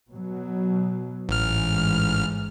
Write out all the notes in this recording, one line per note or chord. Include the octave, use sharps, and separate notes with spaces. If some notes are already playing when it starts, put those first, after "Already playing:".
B2 F#3
A1 G#2 E3 G#3 F6